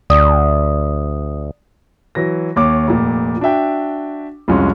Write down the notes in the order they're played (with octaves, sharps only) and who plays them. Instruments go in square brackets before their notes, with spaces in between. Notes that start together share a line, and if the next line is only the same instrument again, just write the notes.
[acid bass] D2 [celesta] D5 D#6
[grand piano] E3 F#3 A#6
D#2 C#5 D6
F1 A#2
D4 F#4 E5 G5
C2 F2 G#3 C#4 F4